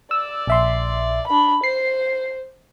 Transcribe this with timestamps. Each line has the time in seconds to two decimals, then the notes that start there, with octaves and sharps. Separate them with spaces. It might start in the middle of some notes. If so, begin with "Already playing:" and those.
0.11 D5 E6
0.47 A#1 E5 C6
1.28 D4 B5
1.64 C5 C7